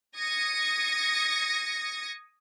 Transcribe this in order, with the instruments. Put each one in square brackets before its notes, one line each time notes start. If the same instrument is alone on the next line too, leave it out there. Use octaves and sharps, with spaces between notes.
[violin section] D#6 G#6 A#6 C#7